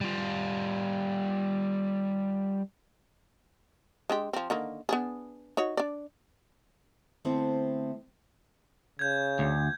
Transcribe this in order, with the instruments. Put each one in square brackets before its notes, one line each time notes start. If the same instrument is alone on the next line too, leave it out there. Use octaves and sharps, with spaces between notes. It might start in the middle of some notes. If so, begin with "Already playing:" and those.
[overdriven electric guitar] G3 F4
[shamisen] G#3 D4 G4
F3 C4
D3 D#3 A#3
B3 D4 G#4
D#4 F#4 C#5
D4 D5
[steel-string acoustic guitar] D3 A3 B3 C4 E4 C5
[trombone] C#3 [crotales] G6 G#6
[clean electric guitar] D2